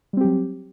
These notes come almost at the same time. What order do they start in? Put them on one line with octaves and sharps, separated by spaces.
G3 C4 G4 F#3